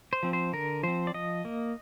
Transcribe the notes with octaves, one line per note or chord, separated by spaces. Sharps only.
C5
F3 C4
C5
D3 A#4
F3 C4 C5
D5
F3 D#5
A#3